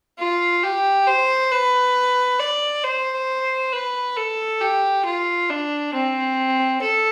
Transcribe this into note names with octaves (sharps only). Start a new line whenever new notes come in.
F4
G4
C5
B4
D5
C5
B4
A4
G4
F4
D4
C4
A4